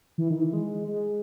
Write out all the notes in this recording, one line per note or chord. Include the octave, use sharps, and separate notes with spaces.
E3
D#3
E3
G#3
G#3